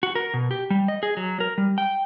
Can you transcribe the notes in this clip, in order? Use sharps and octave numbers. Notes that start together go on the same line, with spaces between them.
F#4
A#4
B2
G4
G3
D#5
G#4
F#3
A#4
G3
G5